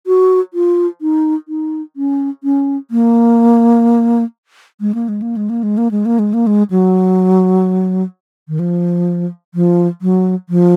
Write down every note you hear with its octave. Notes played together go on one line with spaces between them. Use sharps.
F#4
F4
D#4
D#4
C#4
C#4
A#3
G#3
A#3
G#3
A#3
G#3
A#3
G#3
A#3
G#3
A#3
G#3
A#3
G#3
F#3
D#3
F3
F3
F#3
F3